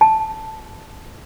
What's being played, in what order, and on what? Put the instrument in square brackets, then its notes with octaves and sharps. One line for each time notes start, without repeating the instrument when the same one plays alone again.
[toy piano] A5